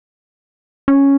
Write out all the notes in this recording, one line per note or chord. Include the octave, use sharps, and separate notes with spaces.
C#4